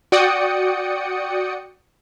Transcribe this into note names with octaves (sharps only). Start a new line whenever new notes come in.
F#4 D5 G5 D#6 C#7